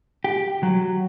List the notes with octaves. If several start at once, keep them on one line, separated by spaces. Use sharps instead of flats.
G4
F#3